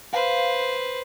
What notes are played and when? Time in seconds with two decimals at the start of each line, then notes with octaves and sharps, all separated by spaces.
0.13 B4 C5 F5